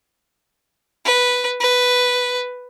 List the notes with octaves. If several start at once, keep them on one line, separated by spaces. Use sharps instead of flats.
B4
B4